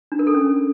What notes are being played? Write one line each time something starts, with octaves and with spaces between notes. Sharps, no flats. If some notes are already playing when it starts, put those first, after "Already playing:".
D4
A#4
A4
C#4